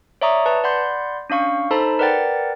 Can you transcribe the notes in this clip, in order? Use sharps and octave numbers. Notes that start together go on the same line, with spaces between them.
C#5 D5 E5 A#5 C#6 D#6
B4 A5
D5 F#5 B5 C6 G6
C#4 D4 F5 C#6
D#4 A4 C5 A5 B5
A#4 B4 D5 F#5 G5 A6